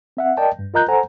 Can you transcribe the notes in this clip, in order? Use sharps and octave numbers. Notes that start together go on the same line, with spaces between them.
C4 E5 F#5
A#4 D5 D#5 G5 A5
G2
F4 A#4 D#5 A#5 F#6 G6
A4 C5 F#5 G#5 A#5